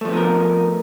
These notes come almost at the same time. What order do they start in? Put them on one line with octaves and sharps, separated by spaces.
A3 F3 B3 D#4 A#4